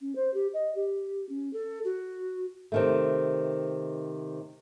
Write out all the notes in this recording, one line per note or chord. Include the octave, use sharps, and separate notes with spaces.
C#4
C5
G4
D#5
G4
C#4
A4
F#4
C3 D#3 A3